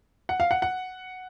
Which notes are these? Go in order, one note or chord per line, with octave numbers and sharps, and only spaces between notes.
F#5
F5
F#5
F#5